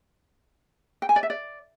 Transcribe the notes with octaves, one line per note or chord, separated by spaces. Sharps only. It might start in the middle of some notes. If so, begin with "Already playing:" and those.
G5
G#5
D5
E5
D5